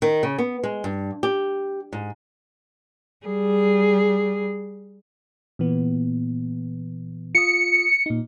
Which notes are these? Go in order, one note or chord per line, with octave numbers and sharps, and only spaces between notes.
D#3
C#3
B3
G#3
G2
G4
G#2
G3 G#4
A#2 E3 B3
F4 D#6 C#7
A#2 D#4